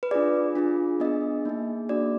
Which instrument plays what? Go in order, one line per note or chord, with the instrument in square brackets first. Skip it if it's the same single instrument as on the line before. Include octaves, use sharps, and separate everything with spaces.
[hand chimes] B4
D4 F4 G#4 D5
D4 F4 G#4
B3 D4 G#4 D#5
A#3 D#4 G#4
A#3 D4 F#4 D5